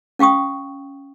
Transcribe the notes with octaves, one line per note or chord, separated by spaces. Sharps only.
C#4 F5 G5 C#6 D#6